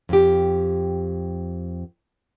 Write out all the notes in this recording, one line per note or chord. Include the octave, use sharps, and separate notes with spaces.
F2 G4